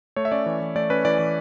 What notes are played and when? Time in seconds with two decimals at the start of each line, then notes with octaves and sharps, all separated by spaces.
0.16 A3 C#5
0.25 E5
0.32 C#4 D5
0.46 E3
0.61 E3
0.76 A3 D5
0.90 C#4 B4
1.05 E3 D5
1.19 E3